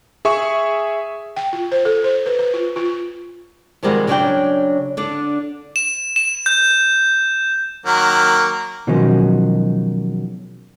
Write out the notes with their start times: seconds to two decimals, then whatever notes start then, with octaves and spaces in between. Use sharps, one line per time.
0.25 G#4 E5 C#6
1.36 G5
1.53 F4
1.72 C5
1.85 A4
2.04 C5
2.26 B4
2.39 B4
2.54 F4
2.76 F4
3.83 C3 D#3 F3 G3 G#3 B3
4.07 C#3 F#3 D4 C#5 D5 G5
4.97 D3 D4
5.76 E7
6.16 E7
6.46 G6
7.86 D#3 F#3 A#3
8.87 B2 D#3 F3 F#3 G#3 C#4